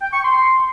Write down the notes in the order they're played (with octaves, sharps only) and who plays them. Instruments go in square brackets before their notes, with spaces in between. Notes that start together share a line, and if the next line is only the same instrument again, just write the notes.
[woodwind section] G5
C#6
C6